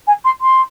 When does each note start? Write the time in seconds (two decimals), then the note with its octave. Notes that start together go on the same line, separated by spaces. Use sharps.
0.07 G#5
0.25 C6
0.41 C6